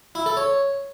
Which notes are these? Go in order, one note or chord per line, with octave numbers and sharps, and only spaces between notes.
E4
A4
C#5